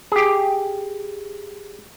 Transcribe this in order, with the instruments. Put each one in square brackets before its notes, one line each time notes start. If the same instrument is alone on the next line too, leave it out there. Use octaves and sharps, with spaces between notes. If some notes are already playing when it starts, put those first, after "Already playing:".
[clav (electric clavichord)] G4 G#4